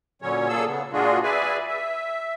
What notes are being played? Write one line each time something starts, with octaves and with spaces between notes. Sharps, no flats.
A#2 D3 F#3 C#4 C#5
A#2 C#3 A#3 G#4 A4 E6
C#3 B3
A#2 G#3 D4 F4 F#4 G#4
G#4 B4 D5 E5 G#5
E5